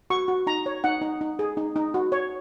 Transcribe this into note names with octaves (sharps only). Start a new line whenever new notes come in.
F#4 C#6
F#4
D#4 A#5
C#5
D#4 F#5
D#4
D#4
G#4
D#4
D#4
F#4
C#5